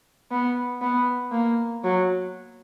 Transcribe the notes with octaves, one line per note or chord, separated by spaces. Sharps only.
B3
B3
A#3
F#3